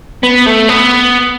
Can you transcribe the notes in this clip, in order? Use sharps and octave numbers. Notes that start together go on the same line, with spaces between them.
B3
A3
B3